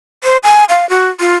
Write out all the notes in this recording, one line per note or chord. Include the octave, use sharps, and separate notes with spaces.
C5
G#5
F5
F#4
F4